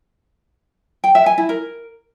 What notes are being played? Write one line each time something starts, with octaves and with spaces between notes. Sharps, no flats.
G5
E5
G#5
E4
A#4